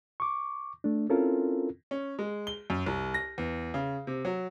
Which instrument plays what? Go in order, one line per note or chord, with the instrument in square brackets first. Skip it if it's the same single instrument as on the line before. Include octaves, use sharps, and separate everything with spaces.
[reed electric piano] C#6 D6
A3 D4
C4 C#4 E4 F4 A4 A#4
[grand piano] C#4
G#3
G7
F#2
C2
A#6
E2
C#3
C3
F#3